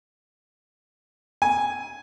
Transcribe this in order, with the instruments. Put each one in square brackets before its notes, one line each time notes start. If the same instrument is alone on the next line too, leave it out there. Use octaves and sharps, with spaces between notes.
[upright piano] G#5